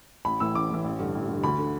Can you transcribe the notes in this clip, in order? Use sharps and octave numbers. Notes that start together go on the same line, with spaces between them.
A1 B5
A2 E3 E6
A1 D6
A2 E3
A1
G2 D3
A1
G2 D3
D2 B5
D3